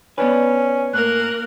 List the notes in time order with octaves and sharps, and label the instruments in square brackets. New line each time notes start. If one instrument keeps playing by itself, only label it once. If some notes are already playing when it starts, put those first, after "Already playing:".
[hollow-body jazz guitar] B3 D4 B4 [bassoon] C#4
[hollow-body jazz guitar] A2 [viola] A#3 A#4 [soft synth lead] F#6